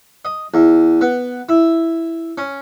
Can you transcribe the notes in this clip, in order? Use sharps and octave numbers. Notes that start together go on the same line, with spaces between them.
D#5
E2
B3
E4
C#4